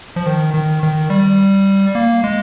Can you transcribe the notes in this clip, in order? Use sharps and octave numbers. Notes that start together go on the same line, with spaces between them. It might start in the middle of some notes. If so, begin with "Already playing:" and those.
F3
D#3
D#3
D#3
G3
A#3
G#3